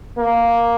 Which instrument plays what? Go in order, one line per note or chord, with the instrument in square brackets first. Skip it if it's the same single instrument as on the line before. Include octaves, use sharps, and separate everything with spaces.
[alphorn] A#3